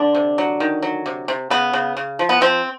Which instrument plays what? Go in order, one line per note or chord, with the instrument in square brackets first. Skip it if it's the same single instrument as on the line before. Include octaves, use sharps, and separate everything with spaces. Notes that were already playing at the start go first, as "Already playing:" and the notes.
Already playing: [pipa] D3 D4
C3
F#3
D#3
F#3
C3
C3
C#3 B3
C#3
C#3
F3
B3
F3 C4